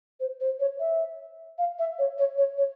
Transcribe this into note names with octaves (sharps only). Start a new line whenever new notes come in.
C5
C5
C#5
E5
F5
E5
C#5
C#5
C#5
C#5